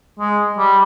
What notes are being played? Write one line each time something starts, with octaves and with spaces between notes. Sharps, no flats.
G#3
G3